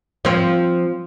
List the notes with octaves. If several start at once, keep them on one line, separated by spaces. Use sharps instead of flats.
F3 C4